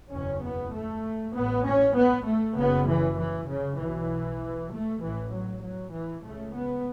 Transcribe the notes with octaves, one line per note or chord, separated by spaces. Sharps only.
F#1 E2 B2 C#4
B3
A3
A1 A2 B3
C#4
B3
A3
F#1 F#2 C#3 B3
E3
E3
C#3
B1 B2 E3
A3
A1 A2 E3
F#3
F#3
E3
C#2 C#3 A3
B3